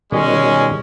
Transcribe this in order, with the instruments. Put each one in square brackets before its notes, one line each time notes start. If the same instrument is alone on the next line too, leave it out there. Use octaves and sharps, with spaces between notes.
[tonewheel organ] B2 D#3 G3 [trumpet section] G#3 C#4